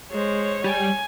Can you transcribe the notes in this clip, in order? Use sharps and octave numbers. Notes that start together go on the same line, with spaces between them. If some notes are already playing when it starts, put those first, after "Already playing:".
G#3 C5 C#5
G3 G#5